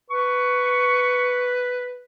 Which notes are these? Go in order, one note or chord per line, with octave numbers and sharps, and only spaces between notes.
B4 C#6